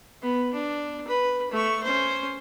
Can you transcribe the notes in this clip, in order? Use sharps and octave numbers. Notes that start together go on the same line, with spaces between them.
B3
D4
B4
A3 C#6
C#4 C5